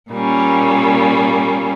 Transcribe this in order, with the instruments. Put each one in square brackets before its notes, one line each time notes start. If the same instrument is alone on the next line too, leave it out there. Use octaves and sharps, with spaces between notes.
[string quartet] A#2 G3 A#3 C#4